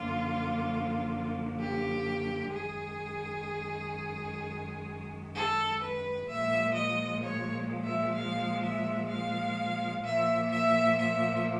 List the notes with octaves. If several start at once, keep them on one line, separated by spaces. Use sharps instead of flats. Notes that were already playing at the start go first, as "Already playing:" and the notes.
Already playing: F#2 D3 F3 A#3 F4
G4
F#2 D#3 G#3 G#4
A4
B4
A#2 F3 G#3 E5
D#5
C#5
E5
F5
E5
F5
A#2 F3 A#3 E5
E5
E5